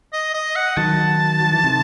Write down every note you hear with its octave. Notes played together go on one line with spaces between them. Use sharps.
D#5
D#5
F#5
D#3 F#3 A5
F#3
E3
C3 D#3